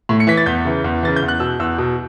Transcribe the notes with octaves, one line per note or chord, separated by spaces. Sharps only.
A2
C#7
E3 B6
A6
E2 G6
C#3 E3
E2
C#3 E3 A6
G6
E2
F#6
B2 E6
E2 E6
B2